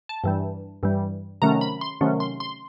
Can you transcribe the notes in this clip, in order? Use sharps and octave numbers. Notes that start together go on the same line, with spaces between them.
A5
G2 E3 G3
G2 E3 G3
C3 D#3 F#3 A3 C#4 A#5
B5
C6
C3 D#3 F#3 A3 C#4
C6
C6